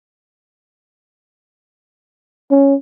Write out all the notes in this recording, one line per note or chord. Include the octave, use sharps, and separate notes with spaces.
C#4